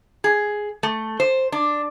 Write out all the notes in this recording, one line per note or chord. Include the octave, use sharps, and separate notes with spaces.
G#4
A3
C5
D4